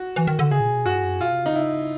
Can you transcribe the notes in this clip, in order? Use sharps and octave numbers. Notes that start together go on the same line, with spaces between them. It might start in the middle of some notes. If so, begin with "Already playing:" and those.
Already playing: F#4
E3
D#3
D3
C#3 G#4
A#2
B2
G2 F#4
F#2
B2 F4
C3
D3 D#4
C#3 E4